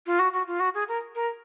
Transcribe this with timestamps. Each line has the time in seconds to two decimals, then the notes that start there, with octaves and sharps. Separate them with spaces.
0.06 F4
0.19 F#4
0.33 F#4
0.47 F4
0.60 F#4
0.74 G#4
0.88 A#4
1.15 A#4